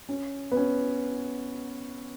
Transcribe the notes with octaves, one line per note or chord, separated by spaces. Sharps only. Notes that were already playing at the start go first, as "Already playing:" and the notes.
C#4
B3
C#4